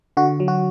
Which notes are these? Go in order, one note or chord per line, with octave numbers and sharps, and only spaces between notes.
D3 F#4
F#3
F#4